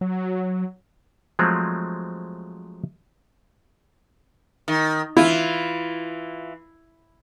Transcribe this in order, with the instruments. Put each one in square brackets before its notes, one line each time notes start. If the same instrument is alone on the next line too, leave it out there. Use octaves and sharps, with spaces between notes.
[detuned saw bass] F#3
[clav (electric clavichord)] F3 F#3 G#3 A3 C4
[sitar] D#3
[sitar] E3 F4 [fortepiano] E4